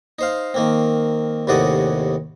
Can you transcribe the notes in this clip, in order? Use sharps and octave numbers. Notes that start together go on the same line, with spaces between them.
D#4 C5 F5
D#3 A#3 C4
D#2 A2 C3 F#4 D5 D#5